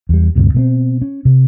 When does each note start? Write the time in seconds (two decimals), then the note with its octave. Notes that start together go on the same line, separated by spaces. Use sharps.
0.09 E2 G3
0.35 D2 G2 C3
0.54 B2 A3 C4
1.02 C#4
1.25 C3